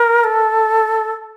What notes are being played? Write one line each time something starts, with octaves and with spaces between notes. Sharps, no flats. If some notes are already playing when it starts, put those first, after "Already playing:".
Already playing: A#4
A4